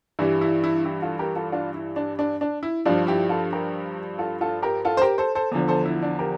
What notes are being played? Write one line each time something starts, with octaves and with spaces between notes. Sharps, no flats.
G2 E3 G3 E4
E4
E4
E4 G4
F4 A4
G4 A#4
F4 A4
D4 F4
E4
D4
D4
D4
E4
G2 F3 D4 F4
E4 G4
F4 A4
G4 A#4
F4 A4
F4 A4
G4 A#4
F4 A4
C5
G4 A#4
A4 C5
A4 C5
E2 D3 F3
A4 C5
E4
D4
G4 A#4